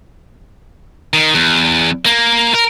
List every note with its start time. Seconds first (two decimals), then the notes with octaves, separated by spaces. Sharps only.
1.13 D#3
1.34 E2
2.06 A#3
2.54 A#4